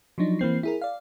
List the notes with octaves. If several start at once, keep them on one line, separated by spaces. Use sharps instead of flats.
F3 F#3 D4 D#4
E3 A#3 C4 C7
E4 G#4 A#4
D5 F5